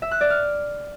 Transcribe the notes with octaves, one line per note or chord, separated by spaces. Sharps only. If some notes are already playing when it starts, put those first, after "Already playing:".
E5
F#6
D5
F6